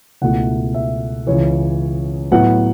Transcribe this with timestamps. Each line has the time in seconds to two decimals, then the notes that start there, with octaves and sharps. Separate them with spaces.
0.22 C#2 B2 A3 E4 F#5
0.74 E5
1.27 C#2 C#3 E3 C#5
2.31 A2 F#3 B3 F#5